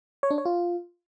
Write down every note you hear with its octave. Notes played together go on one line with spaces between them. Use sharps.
C#5
D4
C#5
F4